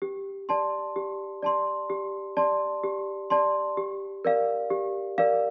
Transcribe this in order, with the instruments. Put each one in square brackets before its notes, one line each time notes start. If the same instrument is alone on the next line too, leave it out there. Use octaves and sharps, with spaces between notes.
[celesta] G4
D5 A5 C6
G4
D5 A5 C6
G4
D5 A5 C6
G4
D5 A5 C6
G4
A#4 D5 F5
G4
A#4 D5 F5